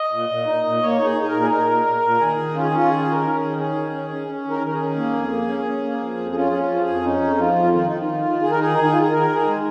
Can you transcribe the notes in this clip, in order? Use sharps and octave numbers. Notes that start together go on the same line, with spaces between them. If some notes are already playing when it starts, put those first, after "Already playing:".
Already playing: D#5
A#2
A#2
D#4
A#2
A#3 C#5
D#4
G#4
D#4
G#4
A#4
A#2
G#4
D#4 A#4
A#2
A#2
A#2
D#3 G#4
D#3
C#4 F4
G#4
C#4 F4
D#3 G#4
C#4
A#4
C#4
G#4
D#3
C#4 G#4
D#3
C#4
C#4
C#4
D#3
A#4
D#3
A#4
G#4
C#4
A#3
F2
A#3
C#4
C#4
A#3
F3
F2
G#4
C#4 F4
C#4 G#4
F4
F3
G#4
F2
C#4 D#4
F2
F3 F4
F2
D#3 F4
D#3 D#4
F4
D#3
D#3
D#3 G#4
A#4
D#4 G#4
D#3
D#4
D#3 F4
G#4
D#3 A#4
D#3 G#4
G#3